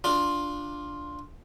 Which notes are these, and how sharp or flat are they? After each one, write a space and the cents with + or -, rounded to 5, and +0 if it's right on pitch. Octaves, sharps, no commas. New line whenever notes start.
D4 +0 F4 +5